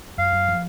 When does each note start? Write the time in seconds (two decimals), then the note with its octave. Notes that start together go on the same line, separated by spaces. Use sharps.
0.18 F#2 F5
0.33 F#2
0.48 F3